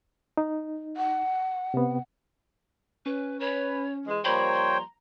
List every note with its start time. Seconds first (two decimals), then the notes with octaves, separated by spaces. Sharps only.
0.37 D#4
0.97 F#5
1.74 C3 B3
3.06 C#4 B4
3.40 B4 C#5
4.06 E3 G#3
4.24 F3 G3 A#3 C5 C#5 G5 A#5 B5
4.53 C6